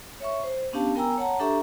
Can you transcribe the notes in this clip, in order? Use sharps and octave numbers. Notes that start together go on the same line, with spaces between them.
C#5 E5 C#6
C5
B3 C#4 D4 G4 F5 A5
B3 A#4 G5 G#5 A#5 E6
C#5 F#5 A5 A#5
D4 G4 A4 E5 A#5 C#6